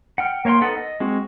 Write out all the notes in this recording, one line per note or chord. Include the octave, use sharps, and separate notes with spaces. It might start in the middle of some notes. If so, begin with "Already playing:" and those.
F#5 G5 F6
A#3 C#5 F5 G5 C6
B3 D#4 A4 F#5
D#5
G#3 C4 F#4